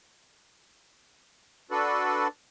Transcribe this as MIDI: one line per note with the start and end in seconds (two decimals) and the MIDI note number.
1.71 2.28 62
1.71 2.28 66
1.71 2.28 69
1.71 2.28 71
1.71 2.28 74